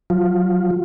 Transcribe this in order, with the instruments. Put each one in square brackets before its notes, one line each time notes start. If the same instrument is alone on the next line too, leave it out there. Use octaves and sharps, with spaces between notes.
[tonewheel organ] F#3 F4